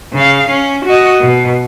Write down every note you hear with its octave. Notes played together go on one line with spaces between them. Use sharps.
C#3 F5
C#4
F#4 D#5
B2